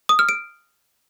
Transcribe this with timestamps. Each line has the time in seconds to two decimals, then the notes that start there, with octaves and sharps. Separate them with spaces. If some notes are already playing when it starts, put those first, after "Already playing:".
0.09 D#6
0.19 F6
0.29 D7